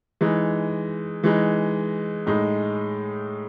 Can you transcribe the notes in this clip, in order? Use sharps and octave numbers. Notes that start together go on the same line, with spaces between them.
E3 G#3 D#4
E3 G#3 D#4
A2 G#3 D#4